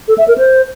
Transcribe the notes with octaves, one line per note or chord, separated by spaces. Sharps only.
A4
E5
A#4
C5